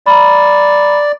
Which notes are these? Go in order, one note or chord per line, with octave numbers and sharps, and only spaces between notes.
D5 A#5 B5